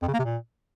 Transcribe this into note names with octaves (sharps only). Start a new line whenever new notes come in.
F2
C#3
A#3
C3
A#2